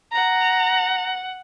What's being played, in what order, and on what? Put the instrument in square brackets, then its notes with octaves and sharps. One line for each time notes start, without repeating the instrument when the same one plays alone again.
[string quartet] F#5 [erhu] A#5